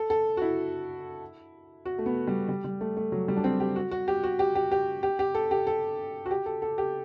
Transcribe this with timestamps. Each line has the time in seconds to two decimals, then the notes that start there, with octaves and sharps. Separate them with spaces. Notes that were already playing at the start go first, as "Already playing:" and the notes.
Already playing: A4
0.10 A4
0.37 F#4
0.42 E4
1.85 F#4
1.99 A3
2.06 B3
2.27 G3
2.49 G3
2.64 G3
2.81 A3
2.97 A3
3.12 F#3
3.28 G3
3.37 D4
3.44 C4
3.60 G4
3.76 F#4
3.91 F#4
4.08 G4
4.23 F#4
4.39 G4
4.55 G4
4.71 G4
5.03 G4
5.19 G4
5.35 A4
5.51 G4
5.67 A4
6.26 F#4
6.31 G4
6.46 A4
6.62 A4
6.78 G4